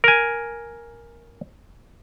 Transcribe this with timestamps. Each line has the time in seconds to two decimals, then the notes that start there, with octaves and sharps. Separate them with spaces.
0.04 A#4 G#5